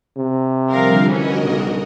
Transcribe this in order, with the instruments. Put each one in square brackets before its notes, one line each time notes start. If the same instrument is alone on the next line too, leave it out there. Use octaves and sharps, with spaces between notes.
[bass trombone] C3
[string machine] D3 F3 G3 [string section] A#4 F5
[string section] E3 C#4 [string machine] F#4 A#4 D#5
[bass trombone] B1 [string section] G2 C#3